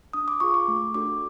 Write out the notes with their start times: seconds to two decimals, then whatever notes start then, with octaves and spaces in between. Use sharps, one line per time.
0.13 D4 D#6
0.28 D6
0.40 F4 G#4 C#6
0.54 D6
0.68 A3
0.94 D4 F#4 A4 D6